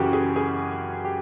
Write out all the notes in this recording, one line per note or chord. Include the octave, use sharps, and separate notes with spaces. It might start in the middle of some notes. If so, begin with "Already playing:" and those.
Already playing: F#2 C#3 E3 F#4 G4
G#4
G#4
G4